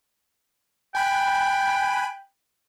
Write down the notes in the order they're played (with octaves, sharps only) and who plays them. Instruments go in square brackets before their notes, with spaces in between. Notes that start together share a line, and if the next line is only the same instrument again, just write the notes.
[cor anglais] G5 [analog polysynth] G#5 B5 F#6